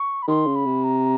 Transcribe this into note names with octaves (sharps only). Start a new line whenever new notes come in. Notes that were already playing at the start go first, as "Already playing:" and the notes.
Already playing: C#6
B5
D#3 C6
C#3
B5
C3
A#5